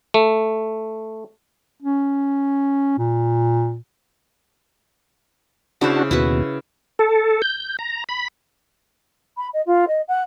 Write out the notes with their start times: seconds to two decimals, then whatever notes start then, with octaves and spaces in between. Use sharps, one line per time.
0.14 A3
1.83 C#4
2.98 A#2
5.81 C#3 D4 E4 F#4 C5
6.11 D#2 B2 E4 F#4 B4
6.99 A4
7.42 G6
7.79 A#5
8.09 B5
9.37 B5
9.53 D#5
9.66 F4
9.87 D#5
10.08 F#5